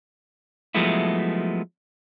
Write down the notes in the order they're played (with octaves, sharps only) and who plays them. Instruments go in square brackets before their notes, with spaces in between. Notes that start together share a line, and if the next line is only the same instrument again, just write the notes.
[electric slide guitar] F3 F#3 G#3 A3 B3 E4